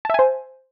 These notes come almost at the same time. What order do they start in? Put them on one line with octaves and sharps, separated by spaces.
A5 E5 G#5 C5